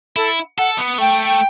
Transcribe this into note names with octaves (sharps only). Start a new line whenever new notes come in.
E4 A4
A4 F#5
B3
A3 G5